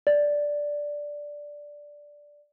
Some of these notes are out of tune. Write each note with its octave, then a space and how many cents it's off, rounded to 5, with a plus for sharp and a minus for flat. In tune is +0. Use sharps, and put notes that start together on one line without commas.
D5 -5